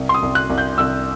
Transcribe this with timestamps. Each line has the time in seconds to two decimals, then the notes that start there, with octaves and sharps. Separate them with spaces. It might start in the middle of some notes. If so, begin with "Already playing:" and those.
Already playing: C2
0.09 C6
0.14 D#6
0.22 C2
0.35 F#6
0.49 C2
0.58 G6
0.78 C2 E6